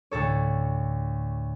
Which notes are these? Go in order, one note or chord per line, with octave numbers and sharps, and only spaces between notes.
D2 A2 A4 C#5